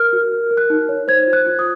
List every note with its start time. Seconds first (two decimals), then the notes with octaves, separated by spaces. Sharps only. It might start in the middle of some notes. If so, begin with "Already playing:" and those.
Already playing: A#4 F6
0.13 F#4
0.32 A#4
0.51 A#4
0.57 F#6
0.70 D#4
0.89 C#5
1.08 C5 G#6
1.27 F4
1.33 F#6
1.46 F4
1.59 D#6